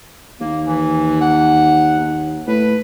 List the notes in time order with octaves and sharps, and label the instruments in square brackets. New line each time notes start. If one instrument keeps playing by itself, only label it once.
[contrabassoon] D#2 [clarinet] A#3
[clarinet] E3
F#5
[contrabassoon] D#2
[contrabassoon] A2 [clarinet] B4